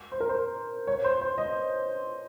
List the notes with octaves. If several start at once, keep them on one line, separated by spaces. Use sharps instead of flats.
C5
A#4
C5
C#5
C5
C5
D#5